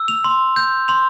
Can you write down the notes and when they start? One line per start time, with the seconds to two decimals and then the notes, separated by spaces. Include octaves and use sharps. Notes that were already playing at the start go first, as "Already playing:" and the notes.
Already playing: E6
0.08 F7
0.24 C6
0.56 G6
0.88 C6 F7